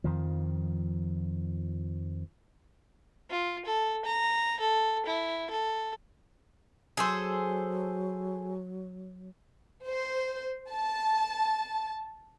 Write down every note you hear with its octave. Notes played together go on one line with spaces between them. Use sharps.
F2 D#3 F3
F4
A4
A#5
A4
E4
A4
F#3 G#4 A4 C5
C5
A5